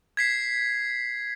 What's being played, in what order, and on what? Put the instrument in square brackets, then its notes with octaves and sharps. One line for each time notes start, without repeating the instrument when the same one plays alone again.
[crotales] G#6 B6 C7